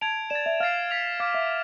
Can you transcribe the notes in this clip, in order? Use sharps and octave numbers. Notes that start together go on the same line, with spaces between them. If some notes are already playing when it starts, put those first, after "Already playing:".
A5 G#6 D7 F7
D5 E7
A6
E5
F5 F6 A6 C7
F6 B6 F7
F5 D6 F6 G#6 C7
E5